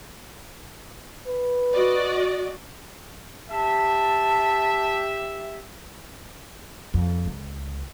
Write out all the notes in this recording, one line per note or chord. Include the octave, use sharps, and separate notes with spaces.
B4
F#4 D5 D#5
G4 E5 A5
F2
C#2 D3